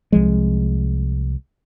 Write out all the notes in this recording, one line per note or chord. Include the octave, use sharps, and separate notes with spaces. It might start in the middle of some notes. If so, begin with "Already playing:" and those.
C2 F3 G#3